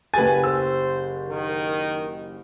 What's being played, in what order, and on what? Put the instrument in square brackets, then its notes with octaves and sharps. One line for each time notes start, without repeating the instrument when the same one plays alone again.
[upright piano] F#1 G4 A6 [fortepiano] B4 G#5
[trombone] C5 [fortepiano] E6
[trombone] D#3